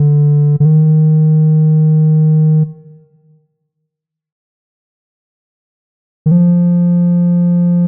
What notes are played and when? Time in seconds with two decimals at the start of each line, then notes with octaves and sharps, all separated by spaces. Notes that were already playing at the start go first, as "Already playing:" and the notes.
Already playing: D3
0.60 D3
0.65 D#3
6.26 D#3
6.31 F3